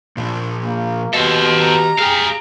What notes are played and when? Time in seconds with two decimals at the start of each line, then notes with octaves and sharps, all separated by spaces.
0.17 A#2 F3
0.65 A#3
1.14 B2 G4 A4 C5 D#5
1.60 A#5
1.99 G4 G#4 F5